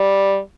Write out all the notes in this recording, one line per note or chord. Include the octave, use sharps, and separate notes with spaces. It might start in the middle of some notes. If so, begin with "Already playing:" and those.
Already playing: G3